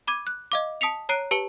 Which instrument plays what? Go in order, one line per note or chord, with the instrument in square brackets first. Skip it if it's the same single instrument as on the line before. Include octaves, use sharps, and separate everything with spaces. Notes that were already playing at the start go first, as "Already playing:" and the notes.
[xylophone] B5 D6 G#6 D#7
F#6
D#5 F5 D6
A5 D#6 B6 C#7 F7
C#5 A#5 F#6 C7 D7 D#7
G4 B4 A5 C#7 G7